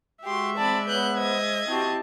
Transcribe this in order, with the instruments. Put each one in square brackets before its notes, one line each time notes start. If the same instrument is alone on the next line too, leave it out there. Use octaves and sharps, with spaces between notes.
[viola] G#3 E5 [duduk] F#4 [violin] G4 C6
[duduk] C4 [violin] D5 B5 [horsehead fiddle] A5
[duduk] B3 [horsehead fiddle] B4 C#5 [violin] F#6 G6
[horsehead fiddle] C5 [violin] D#5 G#6
[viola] C4 A5 [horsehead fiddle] E4 G4 [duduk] F#4